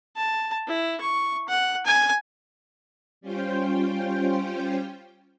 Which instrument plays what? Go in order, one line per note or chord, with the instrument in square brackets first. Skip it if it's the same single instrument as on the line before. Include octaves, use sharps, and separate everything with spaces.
[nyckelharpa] A5
E4
C#6
F#5
G#5
[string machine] G3 C#4 F4 C5 G5